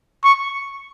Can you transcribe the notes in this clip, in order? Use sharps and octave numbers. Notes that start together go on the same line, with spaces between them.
C#6